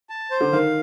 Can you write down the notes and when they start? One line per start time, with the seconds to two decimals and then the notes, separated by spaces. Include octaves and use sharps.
0.09 A5
0.31 C5
0.41 D3
0.52 D#3 F5